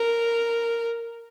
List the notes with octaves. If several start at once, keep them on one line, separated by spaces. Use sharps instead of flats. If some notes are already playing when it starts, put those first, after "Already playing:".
Already playing: A#4